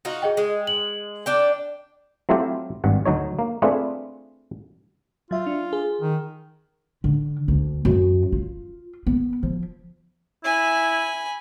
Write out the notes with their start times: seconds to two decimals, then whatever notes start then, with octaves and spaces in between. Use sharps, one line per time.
0.05 D#4 F4 F#4
0.22 G#4 D#5 G5
0.37 G#3
0.67 F#7
1.26 D4 D5 G5
2.29 F#3 A3 C4 E4 F4 G4
2.84 G#1 G2 F#5
3.06 D2 F#3 D#4 C#5
3.39 A#3
3.62 A3 C4 D4 F4 G#4 B4
5.31 F#3 F4 E5
5.47 D4
5.73 G#4
6.01 D#3
7.04 D3
7.48 D2
7.85 F#2
8.32 F4
9.07 B3
9.43 F3
10.44 E4 G#5 B5